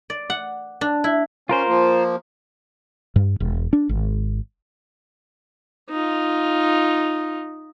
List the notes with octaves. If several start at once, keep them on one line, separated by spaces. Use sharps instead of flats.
D5
F#5
D4
E4
C#4 F4 A#4 C5
F3 A#3
G2
E1
D4
G#1
D#4 F4